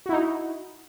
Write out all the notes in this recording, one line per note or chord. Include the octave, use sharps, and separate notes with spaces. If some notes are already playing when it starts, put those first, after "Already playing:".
D#4 E4 F#4